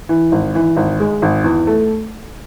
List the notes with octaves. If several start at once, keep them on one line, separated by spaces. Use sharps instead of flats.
E3
G#1
E3
G#1
G#3
G#1
E2
A3